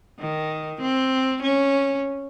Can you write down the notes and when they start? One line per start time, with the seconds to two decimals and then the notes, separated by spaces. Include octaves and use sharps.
0.20 D#3
0.81 C4
1.42 C#4